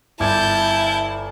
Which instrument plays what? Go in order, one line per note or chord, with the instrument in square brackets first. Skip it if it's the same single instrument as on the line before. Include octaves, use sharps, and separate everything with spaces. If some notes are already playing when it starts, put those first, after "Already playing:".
[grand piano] G1 D6 G#6 [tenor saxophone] E4 [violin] A5 G6